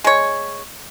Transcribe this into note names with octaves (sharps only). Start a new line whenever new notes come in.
G#3 C#5